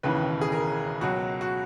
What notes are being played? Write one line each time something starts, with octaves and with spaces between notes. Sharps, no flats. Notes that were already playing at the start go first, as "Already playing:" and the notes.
E1 D#2 C#3 E3 B4
G#4
A#4
C#2 B2 F#3 F#4
F#4